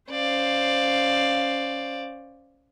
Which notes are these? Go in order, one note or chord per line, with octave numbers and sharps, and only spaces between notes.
C#4 C5 D5 F5